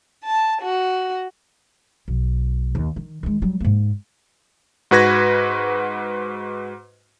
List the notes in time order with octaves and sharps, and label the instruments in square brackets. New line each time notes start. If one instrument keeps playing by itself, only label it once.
[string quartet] A5
F#4
[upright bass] B1
D#2
D#3
D#3 G#3
F#3 G3
G#2 A#3
[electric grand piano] G#2 F#4 B4 G#6 A#6